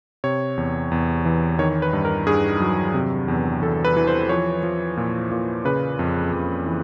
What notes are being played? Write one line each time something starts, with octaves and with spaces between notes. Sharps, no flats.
C3 C#5
E2
E2
E3
D#3 C#5
B4
G2
A#4
G2 G#4
F#3
C3
E2
E2 A4
B4
E3
C5
F3 C#5
F3
A#2
A#2
C#3 B4
F2
F2
E3